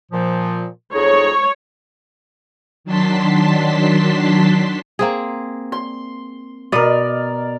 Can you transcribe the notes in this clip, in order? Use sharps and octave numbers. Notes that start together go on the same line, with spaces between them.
A#2 F3
F2 D#4 G#4 C#5
D#3 F#3 D4 A5 C6 B6
A#3 C4 G#4
C6
B2 A#4 D5 D#5